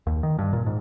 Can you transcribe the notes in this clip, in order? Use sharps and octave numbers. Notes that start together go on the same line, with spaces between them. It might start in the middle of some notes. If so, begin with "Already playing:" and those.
D#2
D#3
G2
A#2
G#2